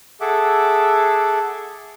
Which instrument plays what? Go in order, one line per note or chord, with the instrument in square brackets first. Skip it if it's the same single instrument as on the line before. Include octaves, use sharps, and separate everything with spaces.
[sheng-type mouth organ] G#4 A4 E5 F#5 D6